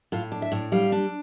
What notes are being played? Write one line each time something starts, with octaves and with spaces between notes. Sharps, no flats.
A2 F4
D4
E5
A2
G3 F5
D4